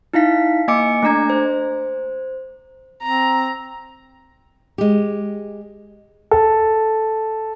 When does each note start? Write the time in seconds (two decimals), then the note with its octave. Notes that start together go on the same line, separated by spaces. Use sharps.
0.13 D#4 E4 F5 B6
0.68 A#3 D#5 G#5 D6 C#7
1.03 A3 D4 A#5 G#6
1.30 C5
3.03 C4 A#5
4.78 G#3 G4
6.31 A4